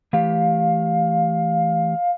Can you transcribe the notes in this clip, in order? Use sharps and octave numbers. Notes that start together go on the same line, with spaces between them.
E3 A3 G4 F5